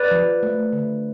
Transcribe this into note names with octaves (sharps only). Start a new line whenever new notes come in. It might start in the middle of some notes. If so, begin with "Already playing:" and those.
Already playing: B4 D5
F3
A3
D3